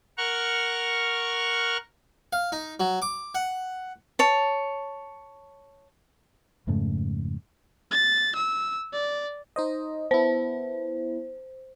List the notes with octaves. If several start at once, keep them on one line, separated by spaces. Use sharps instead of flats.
A#4 F#5 C#6 F6
F5
D#4
F#3
D6
F#5
C#5 A5
F2 G#2 C#3 A3
A6
E6
D5
D#4 C5 D#5
B3 E4 C5